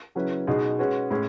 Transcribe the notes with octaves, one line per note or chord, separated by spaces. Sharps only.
C#3 F#3 C#4 E4 B4
B2 G#3 D#4 G#4
G#3 C#4 F#4 B4
A2 G#3 C#4